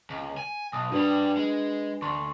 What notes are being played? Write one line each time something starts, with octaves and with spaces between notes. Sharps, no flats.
C#2
G#5
B1 D#6
G2 G3 D4 F#4 B4
G#3
D2 C6 C#6